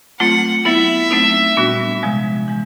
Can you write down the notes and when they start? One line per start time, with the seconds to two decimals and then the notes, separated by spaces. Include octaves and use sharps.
0.20 F#3 A3 C4 F4 F#5
0.65 F#3 B3 E4 E5
1.11 F#3 A3 C4 D#4
1.57 A#2 G3 B3 D4 F#4
2.03 C3 F3 G#3
2.48 E3 G#3